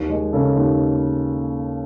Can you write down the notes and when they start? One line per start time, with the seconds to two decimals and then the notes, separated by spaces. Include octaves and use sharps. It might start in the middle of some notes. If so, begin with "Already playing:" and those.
Already playing: D#2
0.10 G#3
0.33 C#3 A4
0.56 D#2